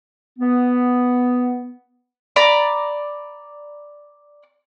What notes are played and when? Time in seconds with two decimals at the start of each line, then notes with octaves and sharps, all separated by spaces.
0.39 B3
2.36 D5 A#5 B5